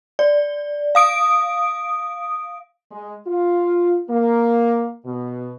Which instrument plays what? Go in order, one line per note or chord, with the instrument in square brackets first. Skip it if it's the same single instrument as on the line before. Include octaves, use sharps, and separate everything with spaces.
[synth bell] D5
F5 D#6 D7
[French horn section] G#3
F4
A#3
B2